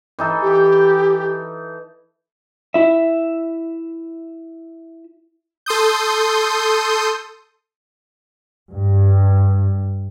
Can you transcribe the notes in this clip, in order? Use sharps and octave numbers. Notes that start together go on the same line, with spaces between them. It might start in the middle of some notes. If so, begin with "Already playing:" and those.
E3 D#4 A4
G4
E4 E5
A4 C6 D#6 G6
G2